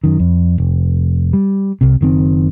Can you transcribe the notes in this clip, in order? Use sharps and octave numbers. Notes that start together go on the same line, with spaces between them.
F#2 D#3
F2
F1
G3
C2 C3
F#1 D#3 C4